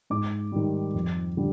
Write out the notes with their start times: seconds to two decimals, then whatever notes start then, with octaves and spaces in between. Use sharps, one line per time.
0.10 G#2 D6
0.52 D#3 G3
0.94 F2
1.37 D3 G3